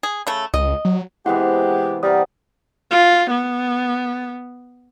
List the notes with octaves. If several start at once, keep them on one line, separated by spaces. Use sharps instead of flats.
G#4
C#3 A3
C#2 D#5
F#3
C3 E3 G#3 B3 E4 G4 F#5
C3 G3 A#4 F#5 D#6
F4
B3